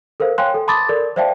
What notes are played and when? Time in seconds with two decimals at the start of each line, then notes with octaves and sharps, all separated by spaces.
0.20 A4 A#4 C5 F5
0.38 C#5 F5 G5 G#5 C6 F#6
0.54 A4
0.68 A5 B5 C6 D6 D#6 A6
0.89 A4 A#4 D5
1.16 C5 D5 E5 F5 G5 A5